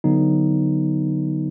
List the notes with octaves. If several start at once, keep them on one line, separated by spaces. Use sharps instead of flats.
D3 F#3 B3 D#4